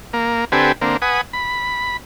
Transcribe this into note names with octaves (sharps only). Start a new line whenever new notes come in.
A#3
D3 C4 G4 A4 B4 G#5
D3 A#3 C4
B4 F#5 G#5 D#6
B5